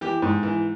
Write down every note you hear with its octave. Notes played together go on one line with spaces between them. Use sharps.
E3 G4
G#2
E3